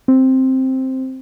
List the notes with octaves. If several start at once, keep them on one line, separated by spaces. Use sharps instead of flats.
C4